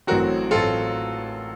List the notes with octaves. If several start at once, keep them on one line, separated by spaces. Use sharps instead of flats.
A1 A2 F#3 A3 C4 F#4 A#4
A1 A2 F#3 A3 C4 F4 A4